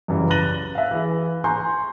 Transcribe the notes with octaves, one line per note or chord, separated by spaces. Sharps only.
F#2 C#3 E3 G3
F#6 A6 A#6 D#7 F#7 G7
E5 F5
E3 G#4
G#5 A#5 C6 C#6 F#6 G6